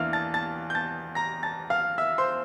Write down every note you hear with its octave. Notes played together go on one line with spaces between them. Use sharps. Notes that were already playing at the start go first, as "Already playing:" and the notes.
Already playing: E2 E3 A#3 D4 E5 F5 F6
A5 A6
A5 A6
G6
A5 A6
A#5 A#6
A5 A6
F5 F6
E5 E6
C5 C6